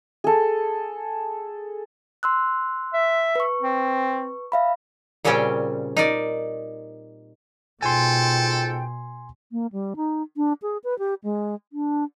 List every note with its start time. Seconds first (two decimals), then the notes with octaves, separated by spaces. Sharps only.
0.24 G#4 A4
2.23 C6 E6 F#6
2.94 E5
3.35 B4 C#6
3.62 C4
4.52 E5 F5 B5
5.25 A#2 C#3 G3 C4 C#4 G5
5.97 D#4 A#4 D5
7.82 G#2 B2 F4 A4 G5 G#5 C6
9.52 A#3
9.72 G3
9.96 D#4
10.37 D4
10.62 G#4
10.84 B4
10.99 G4
11.24 G#3
11.73 D4